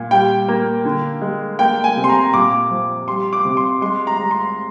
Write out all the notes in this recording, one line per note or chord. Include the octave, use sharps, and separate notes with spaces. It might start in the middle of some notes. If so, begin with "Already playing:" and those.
Already playing: A#2
G3 G5
A#3
D3
G#3
A#3 G5
G#5
C3
C6
A#5
A#2 D6
F3
G3 C6
D6
C3
C6
G#3 C6
A#5
G#3
C6